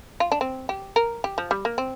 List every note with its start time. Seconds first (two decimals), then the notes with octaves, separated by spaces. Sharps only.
0.20 F4
0.32 D4
0.41 C4
0.69 G4
0.96 A#4
1.24 G4
1.38 F3
1.51 G3
1.65 A#3
1.78 C4